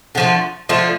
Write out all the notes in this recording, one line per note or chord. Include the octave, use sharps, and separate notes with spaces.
D3 F3 A3
D3 F3 A3